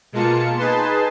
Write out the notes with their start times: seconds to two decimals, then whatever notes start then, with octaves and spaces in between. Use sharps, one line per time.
0.12 B2 G#3 A#3 F4 A5 C#7
0.57 D#4 G#4 B4 A5 C6